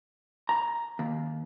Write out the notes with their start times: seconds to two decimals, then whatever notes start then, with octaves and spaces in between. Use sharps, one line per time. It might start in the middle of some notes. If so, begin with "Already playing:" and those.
0.49 A#5
0.99 D#2